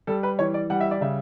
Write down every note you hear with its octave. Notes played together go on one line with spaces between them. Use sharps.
G3 A4
B4
E3 C#5
D5
G3 F#5
E5
D5
C#3 E5